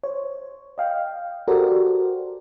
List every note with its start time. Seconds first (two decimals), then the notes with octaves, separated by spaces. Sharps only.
0.03 C5 C#5
0.78 D#5 F5 G5
1.48 F#4 G4 A4 A#4 C5 D5